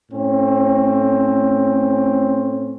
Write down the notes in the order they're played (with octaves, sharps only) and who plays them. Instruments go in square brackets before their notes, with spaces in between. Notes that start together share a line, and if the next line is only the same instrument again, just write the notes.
[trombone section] A2 C4 C#4